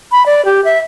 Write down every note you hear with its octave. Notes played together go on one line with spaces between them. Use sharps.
B5
D5
G4
E5